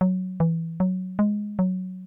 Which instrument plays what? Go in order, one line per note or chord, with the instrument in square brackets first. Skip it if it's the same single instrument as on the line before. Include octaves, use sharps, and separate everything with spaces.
[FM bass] F#3
E3
F#3
G#3
F#3